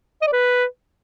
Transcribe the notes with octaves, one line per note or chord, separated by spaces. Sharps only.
D#5
D5
B4